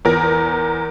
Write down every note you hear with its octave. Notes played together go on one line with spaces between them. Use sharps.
E2 A#4